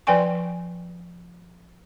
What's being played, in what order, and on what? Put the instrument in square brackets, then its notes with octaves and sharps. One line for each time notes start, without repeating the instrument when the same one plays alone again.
[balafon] F3 B4 D5 G5 G#5 C#6